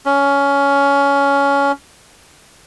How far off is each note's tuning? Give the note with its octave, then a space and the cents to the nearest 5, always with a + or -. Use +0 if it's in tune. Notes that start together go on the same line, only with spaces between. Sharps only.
C#4 +15